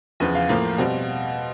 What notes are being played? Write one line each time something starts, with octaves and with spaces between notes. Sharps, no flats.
E2 C#3 F3 B4
F5
A2 F3 A#3
B2 G3 C4